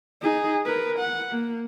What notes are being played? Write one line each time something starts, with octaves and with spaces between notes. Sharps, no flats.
D#4 G#4
A#4 B4
F#5
A#3